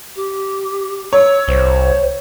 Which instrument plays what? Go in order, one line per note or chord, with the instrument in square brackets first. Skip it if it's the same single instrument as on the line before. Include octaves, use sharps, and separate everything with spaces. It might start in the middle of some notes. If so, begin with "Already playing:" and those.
[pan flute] G4
[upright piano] C#5 [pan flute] E6
[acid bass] C2 [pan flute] C5